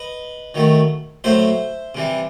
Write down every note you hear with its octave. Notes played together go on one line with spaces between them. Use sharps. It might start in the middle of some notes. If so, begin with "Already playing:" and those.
Already playing: B4 D#5
D#3 F#3 A3
A2 F#3 A3 C5 E5
C3 E3 G3